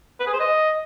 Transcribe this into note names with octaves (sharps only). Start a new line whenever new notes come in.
B4
G#4
C5
D#5